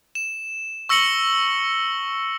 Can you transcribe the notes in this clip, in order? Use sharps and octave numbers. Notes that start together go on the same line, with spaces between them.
E7
C#6 E6 A#6 C#7 F#7 G7